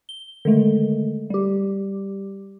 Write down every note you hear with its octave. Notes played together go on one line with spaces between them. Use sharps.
G7
D3 D#3 G#3 A3
G3 G4